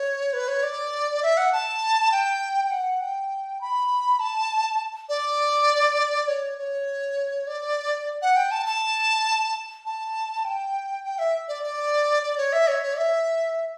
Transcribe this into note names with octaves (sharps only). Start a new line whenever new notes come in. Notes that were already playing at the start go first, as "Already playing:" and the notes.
Already playing: C#5
B4
C#5
D5
E5
F#5
A5
G5
G5
F#5
G5
B5
A5
D5
C#5
C#5
D5
F#5
G5
A5
A5
A5
G5
G5
E5
D5
D5
D5
C#5
E5
C#5
C#5
D5
E5